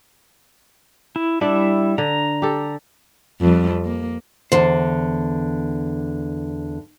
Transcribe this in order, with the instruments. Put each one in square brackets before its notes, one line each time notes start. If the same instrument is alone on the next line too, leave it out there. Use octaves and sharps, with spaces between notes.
[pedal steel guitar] E4
[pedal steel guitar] G3 E4 E5 [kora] D4 D5
[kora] D3 [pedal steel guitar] A#5
[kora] G4 A4
[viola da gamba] F2 F3 G3
A#3
[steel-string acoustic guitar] E2 D3 [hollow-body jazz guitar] C5